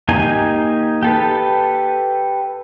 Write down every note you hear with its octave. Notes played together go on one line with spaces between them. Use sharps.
A#3 D#4 G4 G#5
G4 A4 B4